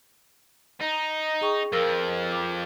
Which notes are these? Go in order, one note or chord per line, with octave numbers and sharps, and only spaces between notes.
D#4
G#4 G5 C#6
F2 F3 A#4 E6 A#6
D6